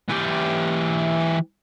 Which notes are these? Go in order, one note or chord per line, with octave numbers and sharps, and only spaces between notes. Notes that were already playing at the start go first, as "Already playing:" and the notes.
E3 G4